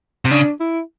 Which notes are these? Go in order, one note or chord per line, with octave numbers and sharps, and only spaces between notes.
C3
C#3 D4
E4